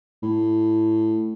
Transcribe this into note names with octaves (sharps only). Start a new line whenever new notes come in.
A2